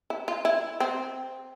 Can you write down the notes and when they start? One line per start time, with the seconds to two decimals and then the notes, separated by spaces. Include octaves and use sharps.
0.10 E4
0.28 F4
0.45 E4
0.80 C4